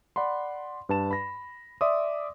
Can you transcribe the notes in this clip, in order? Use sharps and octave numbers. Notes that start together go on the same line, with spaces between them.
D5 F#5 B5 C6
G2 B4 A5 E7
B5 A#6
D5 E5 C6 D6 D#6